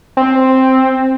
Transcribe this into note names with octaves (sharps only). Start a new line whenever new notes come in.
C4